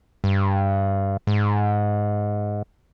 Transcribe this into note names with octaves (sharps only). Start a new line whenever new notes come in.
G2
G#2